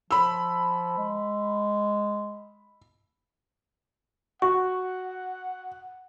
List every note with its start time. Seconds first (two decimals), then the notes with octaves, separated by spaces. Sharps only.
0.11 F3 B5 E6
0.98 G#3
4.42 F#4 F#5 C#6